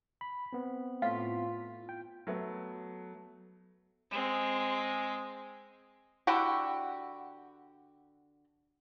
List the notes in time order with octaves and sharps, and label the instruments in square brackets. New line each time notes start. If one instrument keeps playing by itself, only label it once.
[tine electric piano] B5
B3 C4
[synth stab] A2 F4 B6
[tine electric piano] G5
[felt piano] F#3 A3 B3
[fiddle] G#3 C4
[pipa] D3 E4 F#4 G4